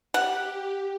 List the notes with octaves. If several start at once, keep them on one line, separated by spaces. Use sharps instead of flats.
G4 F#5